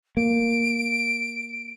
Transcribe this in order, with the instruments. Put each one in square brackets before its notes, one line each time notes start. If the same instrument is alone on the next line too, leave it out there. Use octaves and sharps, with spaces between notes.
[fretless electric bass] A#3 [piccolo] D7